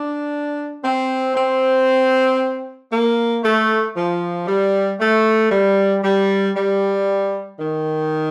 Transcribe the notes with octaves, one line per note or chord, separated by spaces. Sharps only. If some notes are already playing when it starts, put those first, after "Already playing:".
Already playing: D4
C4
C4
A#3
A3
F3
G3
A3
G3
G3
G3
D#3